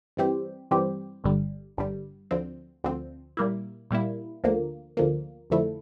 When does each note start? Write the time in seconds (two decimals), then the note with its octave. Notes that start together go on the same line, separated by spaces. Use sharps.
0.17 G2 E3 G3 C4 G4
0.71 G2 E3 G3 C4 G4
1.24 G1 G2 D3 G3
1.78 G1 G2 D3 G3
2.31 D2 D3 F3 C4
2.84 D2 D3 F3 C4
3.37 A#2 G3 A#3 E4
3.91 A#2 G3 A#3 E4
4.44 D2 D3 F3 A#3
4.97 D2 D3 F3 A#3
5.50 F2 D3 F3 A3 E4